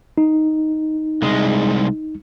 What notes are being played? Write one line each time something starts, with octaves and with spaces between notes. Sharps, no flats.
D#4
C2 G#3